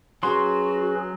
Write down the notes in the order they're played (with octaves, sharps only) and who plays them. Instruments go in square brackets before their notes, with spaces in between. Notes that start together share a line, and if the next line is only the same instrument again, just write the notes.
[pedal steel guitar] F#3 C6 [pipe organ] C#4 G#4 B4 [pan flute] F#4